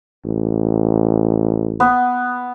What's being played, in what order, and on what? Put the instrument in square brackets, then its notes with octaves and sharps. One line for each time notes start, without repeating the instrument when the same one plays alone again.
[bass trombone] A1
[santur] B3